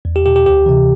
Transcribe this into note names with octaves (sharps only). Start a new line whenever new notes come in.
E2
G4
B2 G4
G4
D2 G4
C3 E3